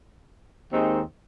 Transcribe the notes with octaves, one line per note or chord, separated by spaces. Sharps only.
D#2 D#3 G#3 C4 D#4